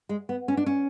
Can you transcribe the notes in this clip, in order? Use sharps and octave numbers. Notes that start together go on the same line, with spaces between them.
G#3
B3
C#4
D4
C#4